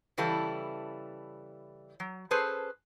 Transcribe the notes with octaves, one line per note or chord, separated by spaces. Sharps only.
C#3 E3 G3 E4 A4
F#3
C#4 G#4 A4 B4 C5